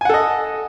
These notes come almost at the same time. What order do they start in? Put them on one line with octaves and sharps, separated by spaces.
G#5 F#5 A4 D#5